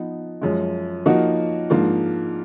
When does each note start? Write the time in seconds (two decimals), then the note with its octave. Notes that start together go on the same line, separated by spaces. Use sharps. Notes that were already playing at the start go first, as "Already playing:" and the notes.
Already playing: F3 B3 D#4
0.41 F#2 F3 G#3
1.06 F3 A#3 D#4 F#4
1.70 G#2 F3 A#3 D4 F4